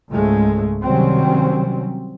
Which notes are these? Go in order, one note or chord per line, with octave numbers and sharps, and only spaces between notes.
C#2 G#2 C#3 G#3 A3
C3 D#3 F#3 G3 C4 C#4